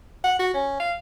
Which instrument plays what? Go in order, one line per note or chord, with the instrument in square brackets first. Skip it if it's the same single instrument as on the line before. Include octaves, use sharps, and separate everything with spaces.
[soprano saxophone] F#5
F#4
C#4
F5